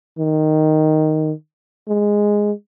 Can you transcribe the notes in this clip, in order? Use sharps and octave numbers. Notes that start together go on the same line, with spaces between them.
D#3
G#3